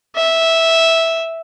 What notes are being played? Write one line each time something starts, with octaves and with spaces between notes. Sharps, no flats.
E5